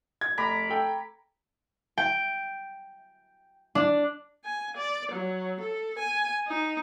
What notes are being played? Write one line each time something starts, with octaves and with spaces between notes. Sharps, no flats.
G#6
F1 A#5 B5 D6
A4 G5
G5
D4
G#5
D5
F#3
A4
G#5
D#4